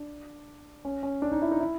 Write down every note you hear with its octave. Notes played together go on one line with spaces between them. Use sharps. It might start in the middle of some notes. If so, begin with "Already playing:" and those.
Already playing: D4
C#4
C#4
D4
D#4
E4
D#4
E4